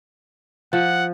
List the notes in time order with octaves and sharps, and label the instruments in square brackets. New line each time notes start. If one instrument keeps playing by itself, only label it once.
[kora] F3 [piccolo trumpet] F#5